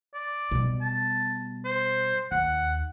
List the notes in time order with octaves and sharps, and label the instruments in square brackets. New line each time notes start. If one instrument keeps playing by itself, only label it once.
[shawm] D5
[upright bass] B2 G3
[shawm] A5
C5
[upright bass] D#2 [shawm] F#5